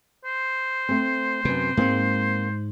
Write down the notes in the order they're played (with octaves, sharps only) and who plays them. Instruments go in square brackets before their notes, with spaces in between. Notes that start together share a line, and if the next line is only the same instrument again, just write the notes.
[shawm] C5
[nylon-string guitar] A3 C4
[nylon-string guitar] F#2 B3 [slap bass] C3
[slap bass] G#2 G#3 [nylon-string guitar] A#3 C4